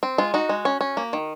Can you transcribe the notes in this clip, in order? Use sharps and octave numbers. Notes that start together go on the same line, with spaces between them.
C4
G#3 F4
D#4 F#4
G#3
C#4
C#4
A#3
D#3